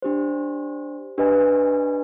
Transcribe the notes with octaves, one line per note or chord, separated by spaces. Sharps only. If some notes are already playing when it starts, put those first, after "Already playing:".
D4 G4 C5
D4 G4 B4 D#5 G#5